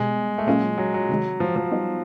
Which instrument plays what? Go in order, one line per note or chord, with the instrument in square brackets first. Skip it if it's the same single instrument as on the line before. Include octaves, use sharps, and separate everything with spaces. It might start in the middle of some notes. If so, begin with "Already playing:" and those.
Already playing: [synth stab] B2 G3 B3 [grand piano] G#3
[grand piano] A3
[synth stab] A#2 F#3 A#3 C#4 F4 [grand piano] G#3
[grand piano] F#3
F#3
[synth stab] C3 D#3 G#3
[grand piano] F3
F3
[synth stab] G3 B3 D#4